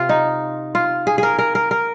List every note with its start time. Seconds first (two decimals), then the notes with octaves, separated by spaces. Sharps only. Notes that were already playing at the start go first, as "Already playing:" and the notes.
Already playing: C3 F4
0.09 D#4
0.75 F4
1.07 G#4
1.18 G#4 A#4
1.39 A#4
1.55 A#4
1.71 A#4